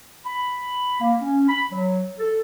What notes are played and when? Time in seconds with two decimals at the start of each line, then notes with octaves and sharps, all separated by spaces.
0.25 B5
1.01 A#3
1.19 C#4
1.48 B5
1.71 F#3
2.19 A4